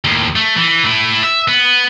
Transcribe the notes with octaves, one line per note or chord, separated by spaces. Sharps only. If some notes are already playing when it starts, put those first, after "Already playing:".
D#2 A2
A3
E3
A3 E4
E5
B3